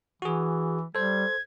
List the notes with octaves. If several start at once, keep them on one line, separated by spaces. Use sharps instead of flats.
E3 F#4 G#4
G3 A4 C5 G#6